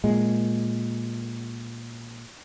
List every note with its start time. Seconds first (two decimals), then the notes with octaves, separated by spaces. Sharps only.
0.04 A#2 G#3